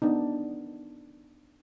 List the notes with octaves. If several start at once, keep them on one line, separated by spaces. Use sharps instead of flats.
B3 D4 D#4